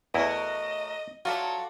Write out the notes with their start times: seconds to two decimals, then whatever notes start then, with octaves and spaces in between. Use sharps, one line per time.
0.14 E2 A3 E4 F#4 A#4 D#5
1.25 F#3 F4 F#4 A4 D5 E5